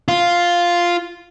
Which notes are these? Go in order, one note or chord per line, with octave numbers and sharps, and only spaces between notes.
F4